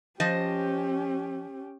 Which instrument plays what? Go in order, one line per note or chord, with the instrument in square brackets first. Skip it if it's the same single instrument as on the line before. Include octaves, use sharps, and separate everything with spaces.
[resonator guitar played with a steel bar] F3 C5 D#5 [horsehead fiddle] C#4 G4